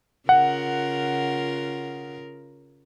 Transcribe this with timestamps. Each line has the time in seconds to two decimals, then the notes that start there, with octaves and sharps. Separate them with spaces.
0.29 C#3 F4 A#4 F#5